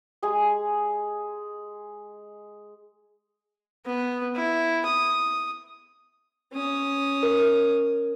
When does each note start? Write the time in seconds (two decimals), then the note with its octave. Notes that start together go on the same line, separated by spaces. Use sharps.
0.23 G#3 G#4 G#5 D#6
3.86 B3
4.36 E4
4.86 D#6
6.53 C#4 D#6
7.23 A#4